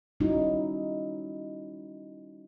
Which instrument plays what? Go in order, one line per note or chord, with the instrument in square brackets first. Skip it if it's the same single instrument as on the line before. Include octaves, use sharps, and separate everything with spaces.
[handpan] G3 C#4 D#4 E4 F#4